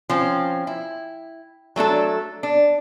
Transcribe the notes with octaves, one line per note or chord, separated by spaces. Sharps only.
F3 C4 C#4
E4
F#3 A3 D4 A4
D4